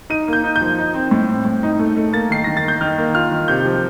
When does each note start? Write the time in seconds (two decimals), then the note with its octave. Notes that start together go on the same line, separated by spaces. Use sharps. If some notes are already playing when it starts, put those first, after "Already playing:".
0.10 D#4 D#7
0.28 A#3
0.33 G6
0.44 D#4
0.56 G6
0.61 F3
0.79 D#4
0.94 C4
1.11 A2
1.29 C4
1.45 A2
1.63 D#4
1.79 A3
1.97 A3
2.13 A#3 A6
2.30 D#3 C7
2.44 D#3 A#6
2.57 A6
2.64 A#3 G6
2.81 D#3 F6
2.98 A#3
3.15 F4 F6
3.31 D#3
3.48 C3 G6
3.65 F3